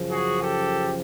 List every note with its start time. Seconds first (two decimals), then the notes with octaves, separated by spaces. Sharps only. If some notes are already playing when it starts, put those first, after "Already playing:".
Already playing: F#2 C#3 F3
0.11 F#4 G#4
0.42 G4 A4